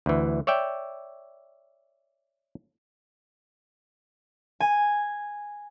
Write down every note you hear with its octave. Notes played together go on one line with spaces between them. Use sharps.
D2 E3
C#5 D5 E5 G5
G#5